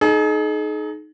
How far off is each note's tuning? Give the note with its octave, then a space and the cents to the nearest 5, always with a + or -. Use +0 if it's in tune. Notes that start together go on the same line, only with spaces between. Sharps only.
D#4 -10 G#4 +40